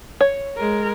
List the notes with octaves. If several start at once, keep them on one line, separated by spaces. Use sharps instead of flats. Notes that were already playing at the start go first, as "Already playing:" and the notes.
C#5
G#3 A#4